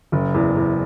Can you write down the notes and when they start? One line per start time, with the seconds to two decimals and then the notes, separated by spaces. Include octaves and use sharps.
0.12 F#1
0.35 E2
0.57 E2